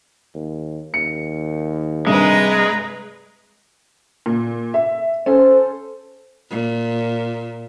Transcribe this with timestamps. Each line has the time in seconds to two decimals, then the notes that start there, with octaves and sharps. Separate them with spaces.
0.34 D#2
0.94 D#2 C#7
2.07 G2 C3 G#3 B4 A#5
4.26 A#2
4.74 E5
5.26 C#4 A4 C5
6.50 A#2